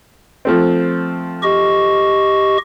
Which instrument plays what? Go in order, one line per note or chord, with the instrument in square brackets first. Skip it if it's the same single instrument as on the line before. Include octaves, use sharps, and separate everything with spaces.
[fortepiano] F3 A3 C4
[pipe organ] G4 D#5 C#6